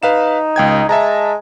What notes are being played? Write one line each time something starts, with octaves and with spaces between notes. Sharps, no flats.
D#4 B4 F5 E7
C#2 G5 G#6
G#3 E5 A5 A#5